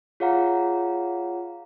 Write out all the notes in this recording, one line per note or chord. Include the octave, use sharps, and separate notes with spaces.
F4 G#4 C#5 F5 F#5 A#5